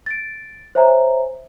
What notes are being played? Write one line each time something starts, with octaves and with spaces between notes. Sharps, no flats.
A6 D7
C5 C#5 E5 G#5 A#5